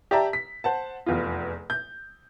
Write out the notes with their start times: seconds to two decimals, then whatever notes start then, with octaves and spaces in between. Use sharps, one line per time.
0.11 G4 D5 E5 A5 A#5
0.33 B6
0.64 C5 F#5 A5
1.06 F1 E2 F4
1.70 G6